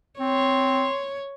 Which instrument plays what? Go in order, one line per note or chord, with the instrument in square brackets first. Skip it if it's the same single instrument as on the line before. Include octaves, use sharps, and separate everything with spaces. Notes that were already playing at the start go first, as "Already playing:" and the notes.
[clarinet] C4 [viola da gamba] C#5 [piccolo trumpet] C6